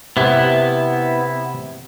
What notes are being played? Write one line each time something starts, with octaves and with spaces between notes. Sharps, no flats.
C3 B3 E4